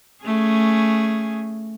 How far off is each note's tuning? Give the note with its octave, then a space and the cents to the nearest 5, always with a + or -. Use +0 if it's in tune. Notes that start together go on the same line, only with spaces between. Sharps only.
A3 +0 C#4 +0 G#4 +0